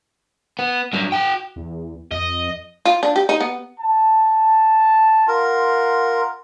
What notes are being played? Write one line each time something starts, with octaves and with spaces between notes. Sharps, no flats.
B3
G2 F#3
F#4 G5
E2
F2 D#5
F4
D4
G4
D#4
B3
A5
F4 A#4 F#5 C6